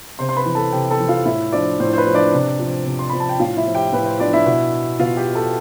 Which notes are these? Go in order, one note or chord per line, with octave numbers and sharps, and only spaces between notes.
C3 C5 C6
C6
B4 B5
E3
A4 A5
C3 G4 G5
A4 A5
E3
F4 F5
A2 E4 E5
F3 D4 D5
A2 C5
C5
B4
F3
D4 D5
C3
F3
C3
C6
F3 B5
A5
G5
A2 F4 F5
E4 E5
F3
G4 G5
A2 B4
C5
F3 D4 D5
E4 E5
B2
B2 F4 F5
G4 G5
A4 A5